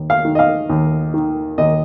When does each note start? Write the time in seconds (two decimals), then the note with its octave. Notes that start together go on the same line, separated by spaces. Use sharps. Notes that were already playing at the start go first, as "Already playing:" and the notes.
Already playing: D#2
0.10 F5
0.25 D#3
0.35 D#5
0.39 F5
0.69 D#2
1.14 D#3
1.58 D#2 D#5